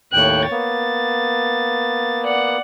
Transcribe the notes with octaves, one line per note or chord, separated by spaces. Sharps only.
D#2 A2 C#5 G5 F#6
A#3 B3 A6
D5 F#5